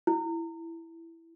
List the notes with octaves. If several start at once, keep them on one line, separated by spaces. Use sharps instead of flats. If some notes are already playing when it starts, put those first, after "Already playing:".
E4